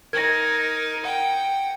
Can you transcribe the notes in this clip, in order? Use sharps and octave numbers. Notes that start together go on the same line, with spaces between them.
D#4 A#4 G#6 A#6
F#5 G5